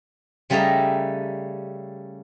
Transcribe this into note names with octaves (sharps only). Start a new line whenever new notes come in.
C#3 G3 A3 A4 D#5 A#5